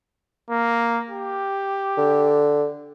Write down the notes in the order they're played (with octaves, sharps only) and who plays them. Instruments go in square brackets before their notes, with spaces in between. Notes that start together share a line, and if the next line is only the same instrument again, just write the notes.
[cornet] A#3
G4
[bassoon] D3